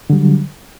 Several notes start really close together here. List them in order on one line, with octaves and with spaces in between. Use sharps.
D3 G3 F#3